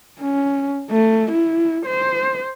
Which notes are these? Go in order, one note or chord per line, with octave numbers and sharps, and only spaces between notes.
C#4
A3
E4
C5